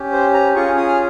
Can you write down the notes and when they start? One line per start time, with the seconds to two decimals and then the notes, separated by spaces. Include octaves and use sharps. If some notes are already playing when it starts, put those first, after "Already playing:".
Already playing: C#4 G4
0.12 C5
0.33 A#5
0.55 C#4 F4 G#4 C#6
0.77 D#6
0.88 F6